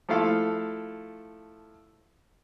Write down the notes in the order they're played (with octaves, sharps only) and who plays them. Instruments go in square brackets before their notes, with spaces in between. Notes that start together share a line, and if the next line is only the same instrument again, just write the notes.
[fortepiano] F3 A3 E4 A4 F5